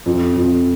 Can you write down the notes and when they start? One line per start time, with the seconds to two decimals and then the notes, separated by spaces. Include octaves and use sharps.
0.06 F2
0.36 F2